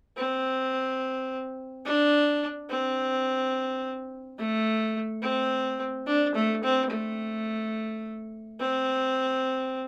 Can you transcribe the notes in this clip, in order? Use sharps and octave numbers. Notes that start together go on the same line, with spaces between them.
C4
D4
C4
A3
C4
D4
A3
C4
A3
C4